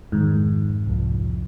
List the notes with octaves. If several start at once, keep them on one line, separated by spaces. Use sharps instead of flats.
F2 G#2 D#3
C2 F2